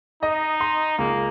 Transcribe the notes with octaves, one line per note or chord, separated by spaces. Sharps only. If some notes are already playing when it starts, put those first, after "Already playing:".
D#4 D#5
C6
C#2 A#3